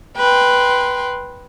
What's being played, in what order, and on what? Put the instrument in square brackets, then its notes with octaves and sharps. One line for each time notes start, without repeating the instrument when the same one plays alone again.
[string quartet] B4 G5 C6